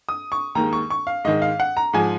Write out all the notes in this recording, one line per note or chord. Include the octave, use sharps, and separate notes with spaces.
D#6
C#6
D#2 D#3 G#3 A#5
C#6
C#6
F5
G#2 D#3 G#3 D#5
F5
F#5
A#5
G#2 F3 G#3 G#5